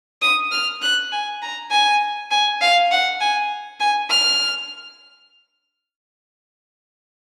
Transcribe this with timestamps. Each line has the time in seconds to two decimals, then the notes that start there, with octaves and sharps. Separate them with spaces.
0.22 D#6
0.52 F6
0.82 F#6
1.12 G#5
1.42 A#5
1.71 G#5
2.31 G#5
2.61 F5
2.91 F#5
3.21 G#5
3.80 G#5
4.10 F6